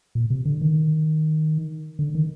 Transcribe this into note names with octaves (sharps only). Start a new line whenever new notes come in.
A#2
C3
D3
D#3
D3
D#3